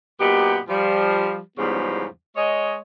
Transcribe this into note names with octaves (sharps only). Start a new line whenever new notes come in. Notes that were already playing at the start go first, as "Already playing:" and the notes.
F#2 A#2 B3 D#4 G4
F3 G3
E2 G#2 C#3 F3 G3 B3
G#3 C#5 D#5